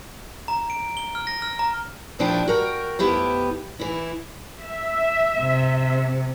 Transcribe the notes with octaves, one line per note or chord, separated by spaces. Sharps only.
A#5
D7
G7
F6
A#6
F6
A#5
D#2 A#2 F3 D4 E4 G5
F#4 A#4 G5
F2 B3 E4 G4 G5
E3 E4
E5
C3